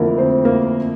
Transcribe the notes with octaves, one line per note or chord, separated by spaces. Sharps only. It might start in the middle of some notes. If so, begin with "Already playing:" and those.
Already playing: F2 D3 F3 A3 A#3 E4 A#4
C4 C5
A#3 A#4